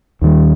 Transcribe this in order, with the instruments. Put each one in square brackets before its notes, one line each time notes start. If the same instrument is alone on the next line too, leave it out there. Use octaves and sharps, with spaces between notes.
[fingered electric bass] D#2 D#3 G3